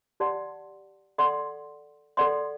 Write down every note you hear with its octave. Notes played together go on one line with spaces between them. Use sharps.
G4 D5 F#5 A5 C6
A4 D5 F#5 C6
A4 D5 F#5 C6